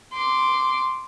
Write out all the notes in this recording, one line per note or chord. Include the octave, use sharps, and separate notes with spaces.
C6 D6